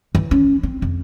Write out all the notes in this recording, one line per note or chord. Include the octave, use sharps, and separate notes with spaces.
E3
C#4
C4
F2